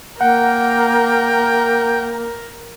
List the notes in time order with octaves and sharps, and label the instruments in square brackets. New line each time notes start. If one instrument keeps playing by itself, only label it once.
[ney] A#3 [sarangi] A#4 [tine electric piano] F#5 [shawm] G5